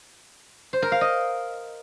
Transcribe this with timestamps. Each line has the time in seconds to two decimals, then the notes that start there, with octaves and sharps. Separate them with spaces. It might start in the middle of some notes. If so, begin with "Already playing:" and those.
0.73 C5
0.82 A#4
0.92 F5
1.01 D#5